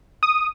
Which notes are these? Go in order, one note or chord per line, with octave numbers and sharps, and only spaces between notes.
D#6